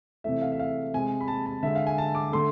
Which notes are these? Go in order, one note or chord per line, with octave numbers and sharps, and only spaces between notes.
C3 E3 A3 E5
F5
E5
F5
C3 G#3 G#5
B5
A5
A5
D3 G#3 E5
F5
G#5
A5
D6
D3 A3 C6